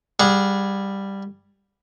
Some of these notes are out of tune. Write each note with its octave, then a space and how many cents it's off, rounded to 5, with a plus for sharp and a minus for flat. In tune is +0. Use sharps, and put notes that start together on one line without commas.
G3 +5 G#4 -5 F#5 -30